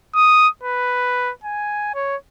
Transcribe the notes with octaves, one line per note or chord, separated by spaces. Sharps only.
D#6
B4
G#5
C#5